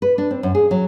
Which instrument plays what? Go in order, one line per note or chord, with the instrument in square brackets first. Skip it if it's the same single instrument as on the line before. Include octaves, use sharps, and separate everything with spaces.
[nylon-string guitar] B4
D4
C4
F#2
G#4
F#3